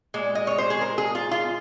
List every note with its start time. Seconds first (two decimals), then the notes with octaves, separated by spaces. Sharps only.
0.14 A#2 G#3
0.35 D#5
0.47 C#5
0.58 C5
0.70 G#4
0.81 A#4
0.98 G#4
1.15 F4
1.31 F4